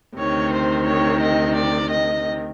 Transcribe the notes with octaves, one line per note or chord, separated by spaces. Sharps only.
D2 C3 D#3 C#5
C5
C#5
D#5
D5
D#5